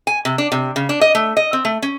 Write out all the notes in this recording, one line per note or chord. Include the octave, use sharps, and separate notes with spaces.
G#5
C3
D4
C3
C#3
D4
D#5
A3
D#5
C4
A3
C#4